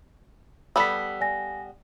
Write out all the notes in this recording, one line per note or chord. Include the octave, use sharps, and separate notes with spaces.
G3 B3 A4 E6 B6
D5 G#5 A#6